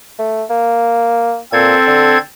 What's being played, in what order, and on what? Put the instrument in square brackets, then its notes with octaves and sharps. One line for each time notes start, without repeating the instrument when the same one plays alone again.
[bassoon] A3
A#3
[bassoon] A#2 [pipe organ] C4 A4 G#6
[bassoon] D3